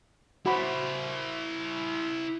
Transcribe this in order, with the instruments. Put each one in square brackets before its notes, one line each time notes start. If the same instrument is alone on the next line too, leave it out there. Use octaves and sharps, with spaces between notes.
[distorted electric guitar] E4 C5 [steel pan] F#4 B5